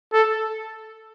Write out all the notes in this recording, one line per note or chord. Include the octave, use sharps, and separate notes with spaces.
A4